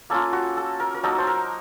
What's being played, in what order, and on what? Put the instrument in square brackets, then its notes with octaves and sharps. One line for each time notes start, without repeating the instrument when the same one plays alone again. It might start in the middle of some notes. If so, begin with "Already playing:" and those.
[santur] A#3 C#4 F4 A4
F#4
A4
A#4
A#4
F#3 A#3 D#4 A4
C5
A#4